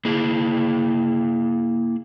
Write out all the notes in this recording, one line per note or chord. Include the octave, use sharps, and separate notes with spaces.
A#3 E4 G#4